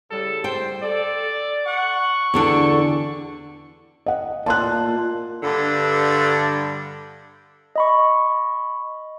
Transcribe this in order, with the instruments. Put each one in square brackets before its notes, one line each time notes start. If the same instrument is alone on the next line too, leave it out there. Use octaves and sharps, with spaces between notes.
[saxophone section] A2 C#3 G3 [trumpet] A4
[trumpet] C5 [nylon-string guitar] G5
[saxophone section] A4 [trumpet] D5
[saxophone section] F#5 [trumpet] C#6
[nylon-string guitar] E2 D3 D4 [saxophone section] F#4 G4 A4
[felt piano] D#5 F#5
[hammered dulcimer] A#2 [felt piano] A5 C6 F#6
[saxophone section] G2 D3
[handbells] D#5 B5 C#6